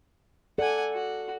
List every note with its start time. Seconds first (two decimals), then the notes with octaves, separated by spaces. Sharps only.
0.58 A4 D5 F#5 G#5
0.93 F#4